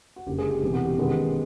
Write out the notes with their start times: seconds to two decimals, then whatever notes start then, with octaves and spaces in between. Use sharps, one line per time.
0.16 F#4
0.27 F#1 F#2 D3 G4
0.38 G#3 G#4
0.50 G4
0.62 E1 E2 C3 E3 G4
0.74 F#4
0.85 G4
0.98 F#2 D#3 G#3 B3